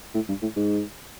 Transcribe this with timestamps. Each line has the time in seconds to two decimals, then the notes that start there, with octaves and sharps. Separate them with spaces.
0.15 A2
0.29 G2
0.42 A2
0.56 G#2